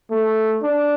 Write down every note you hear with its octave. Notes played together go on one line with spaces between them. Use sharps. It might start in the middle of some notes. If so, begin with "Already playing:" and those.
A3
D4